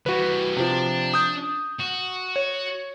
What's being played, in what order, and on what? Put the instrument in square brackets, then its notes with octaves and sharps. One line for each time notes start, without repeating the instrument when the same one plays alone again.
[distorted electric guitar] E3 G3 [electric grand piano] F#4 B4
[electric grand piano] C3 F3 [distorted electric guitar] D4
[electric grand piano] D#6 G6
[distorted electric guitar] F#4
[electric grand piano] C#5